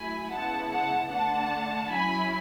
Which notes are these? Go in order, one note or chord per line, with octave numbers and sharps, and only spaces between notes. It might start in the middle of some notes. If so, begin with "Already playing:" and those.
Already playing: F#3 A3 E4 G#5 B5
C#3 G#3 B3 E4 F#5 A5
F#5 A5
D3 A3 D4 F#5 A5
F#3 C#4 E4 G#5 B5